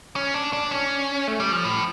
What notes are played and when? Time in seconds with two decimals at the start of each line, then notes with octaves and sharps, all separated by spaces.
0.16 C#4
0.34 D4
0.53 D4
0.71 C#4
1.28 A3
1.40 G3
1.52 F3
1.65 A2